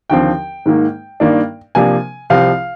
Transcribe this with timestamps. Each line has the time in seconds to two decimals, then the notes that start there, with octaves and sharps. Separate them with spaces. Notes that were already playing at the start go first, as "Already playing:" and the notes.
0.10 D#2 D3 F3 C4 G5
0.66 G#2 D#3 A#3
1.20 G2 D#3 A#3 D4
1.75 C3 F3 A#3 D4 G#5
2.30 C2 C3 F3 C4 F5